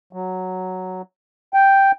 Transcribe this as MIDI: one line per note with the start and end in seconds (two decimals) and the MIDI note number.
0.13 1.02 54
1.54 1.92 79